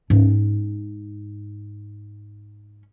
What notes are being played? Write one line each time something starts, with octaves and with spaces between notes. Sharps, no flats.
G#2 C#4